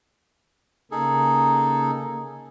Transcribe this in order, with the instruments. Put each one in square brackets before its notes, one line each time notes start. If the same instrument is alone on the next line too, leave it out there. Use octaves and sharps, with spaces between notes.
[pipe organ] C#3 A#3 [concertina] D#4 G#4 A4